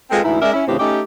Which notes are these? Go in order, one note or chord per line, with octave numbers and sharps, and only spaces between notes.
G#3 C4 F4 G#4 A4 B4
D2 G#2 E3 E4
G#3 C#4 A#4 D5 E5
C#4 E4
D2 A2 C#3 E3 C4 G4
A3 C#4 D#4 G4